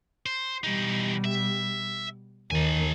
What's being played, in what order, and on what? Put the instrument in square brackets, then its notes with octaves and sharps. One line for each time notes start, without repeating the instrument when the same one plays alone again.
[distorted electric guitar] C5
[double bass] B2 G3 [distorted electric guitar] E3 D#4
[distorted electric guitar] E5
[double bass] D#2 D#3 [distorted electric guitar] A4 G#5